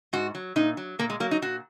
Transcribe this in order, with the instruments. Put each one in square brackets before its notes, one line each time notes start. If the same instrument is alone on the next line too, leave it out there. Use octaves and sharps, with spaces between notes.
[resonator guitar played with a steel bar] G#2 F#4
F#3
A#2 D#4
F#3
A#2 A#3
G#3
F#3 A#3
D#4
A#2 F#4